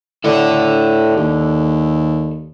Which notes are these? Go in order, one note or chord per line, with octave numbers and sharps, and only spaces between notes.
A2 A4 D5
D#2